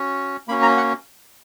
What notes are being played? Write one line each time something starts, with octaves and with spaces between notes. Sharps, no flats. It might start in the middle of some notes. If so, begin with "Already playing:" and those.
Already playing: C#4 F#4
A#3 C#4 F#4 B5
A#5
F#5